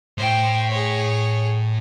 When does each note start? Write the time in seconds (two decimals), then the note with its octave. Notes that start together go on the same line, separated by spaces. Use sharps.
0.18 A2 C5 G5
0.70 G#4 C#5